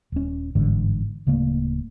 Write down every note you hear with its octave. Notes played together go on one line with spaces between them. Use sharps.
D#1 C#4
G1 G#2 D3 E3
D1 C#3 A3 A#3